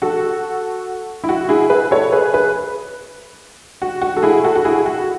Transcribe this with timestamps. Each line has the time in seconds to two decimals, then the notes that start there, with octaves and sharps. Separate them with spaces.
0.02 F#4 A4
1.24 E4
1.29 F#4
1.49 E4 G#4
1.70 G#4 B4
1.91 A4 C#5
2.12 G#4 B4
2.33 G#4 B4
3.82 F#4
4.02 F#4
4.17 A4
4.23 E4 G#4
4.44 F#4 A4
4.55 F#4
4.65 E4 G#4
4.86 F#4